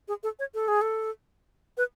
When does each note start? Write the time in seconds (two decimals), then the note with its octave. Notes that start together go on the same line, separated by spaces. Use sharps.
0.08 G#4
0.23 A4
0.39 C#5
0.54 A4
0.68 G#4
0.82 A4
1.77 B4